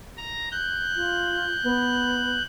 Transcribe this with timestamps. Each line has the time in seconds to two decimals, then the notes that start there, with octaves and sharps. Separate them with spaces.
0.17 A#5 A#6
0.52 F#6 G6
0.96 F4
1.64 B3